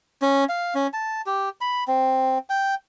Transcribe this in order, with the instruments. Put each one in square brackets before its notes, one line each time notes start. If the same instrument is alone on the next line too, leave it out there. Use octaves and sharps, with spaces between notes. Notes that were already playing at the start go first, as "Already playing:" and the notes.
[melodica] C#4
F5
C#4
A5
G4
B5
C4
G5